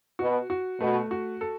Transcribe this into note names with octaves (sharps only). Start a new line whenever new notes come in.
B2 F#4
F#4
B2 A3
F#4
A4